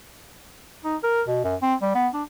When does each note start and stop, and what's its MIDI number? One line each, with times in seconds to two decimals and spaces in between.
0.84 0.96 63
1.03 1.22 70
1.27 1.41 47
1.44 1.56 42
1.62 1.75 60
1.82 1.91 55
1.95 2.08 59
2.14 2.23 62